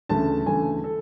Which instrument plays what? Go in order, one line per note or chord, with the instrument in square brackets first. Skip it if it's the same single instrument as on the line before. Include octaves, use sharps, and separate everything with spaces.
[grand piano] D2 C#3 E3 A3 A5
D2 C#3 E3 A3 G#5
A4